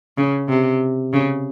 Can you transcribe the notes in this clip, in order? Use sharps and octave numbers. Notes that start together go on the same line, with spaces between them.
C#3
C3
C#3